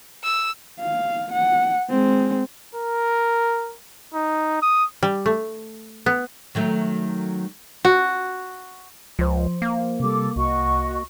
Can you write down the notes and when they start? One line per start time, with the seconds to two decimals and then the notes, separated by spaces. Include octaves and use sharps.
0.24 E6
0.80 F5
1.32 F#5
1.89 G#3 C4
2.75 A#4
4.14 D#4
4.62 D#6
5.03 G3
5.26 A3
6.06 B3
6.55 D#3 F#3 A3
7.85 F#4
9.19 C#2 F3 C5
9.62 A#3
10.00 C3 G3 A4 D6
10.36 C2 F#4 D#5 C#6